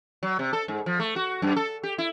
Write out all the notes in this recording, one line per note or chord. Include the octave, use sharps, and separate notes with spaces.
F#3
C3
A4
G#2
F3
A3
F#4
F#2
A4
G4
E4